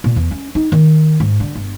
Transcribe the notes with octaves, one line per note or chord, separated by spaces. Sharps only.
A#2
E2
C#4
D#4
D#3
G#2
D3
G1